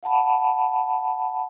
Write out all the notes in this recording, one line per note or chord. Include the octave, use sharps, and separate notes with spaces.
F5 F#5 A5 B5